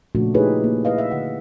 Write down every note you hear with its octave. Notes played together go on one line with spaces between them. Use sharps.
A#2 C#3 F3 A3 D4 F#4
D#4 E4 G4 G#4 B4 C#5
A#3
E4 B4 D#5 F5
E5
D3 F#5